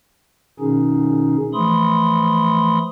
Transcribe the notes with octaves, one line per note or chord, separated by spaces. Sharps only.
B2 D#3 C#4 D#4 G#4
E3 F3 A3 B5 C6 D#6